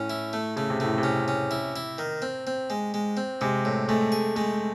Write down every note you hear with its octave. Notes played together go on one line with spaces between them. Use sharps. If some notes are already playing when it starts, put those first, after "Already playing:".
Already playing: A2 C#4
E4
A3
C#3 A3
C3
A2 A3
C3
C#4
C#4
E4
E4
D#3
C4
C4
G#3
G#3
C4
C3 G#3
A2
G#3 A3
G#4
G#3 A3